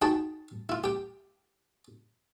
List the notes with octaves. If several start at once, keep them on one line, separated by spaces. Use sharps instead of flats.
D#4 F#4 G#4 G5 A5 B5
E4 F4
G4 G5